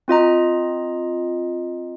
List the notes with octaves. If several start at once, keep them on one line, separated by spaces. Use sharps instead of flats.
C4 F4 D#5 A#5